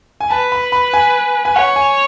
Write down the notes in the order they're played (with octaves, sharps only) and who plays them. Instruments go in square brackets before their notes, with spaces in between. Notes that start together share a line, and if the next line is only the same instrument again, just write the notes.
[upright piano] G#5
[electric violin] B4 [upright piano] A5
[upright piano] B5
B5
G#5
G#5
[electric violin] C#5 [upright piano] F#5
[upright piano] G#5